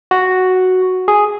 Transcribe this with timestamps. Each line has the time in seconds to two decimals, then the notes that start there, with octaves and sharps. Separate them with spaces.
0.11 F#4
1.08 G#4